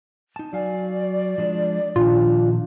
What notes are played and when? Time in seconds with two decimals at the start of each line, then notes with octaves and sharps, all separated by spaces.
0.36 D#4 A5
0.53 F#3 D5 F5 G#5
1.38 F3 G#3 D4
1.96 A#2 D#3 F3 D4 F4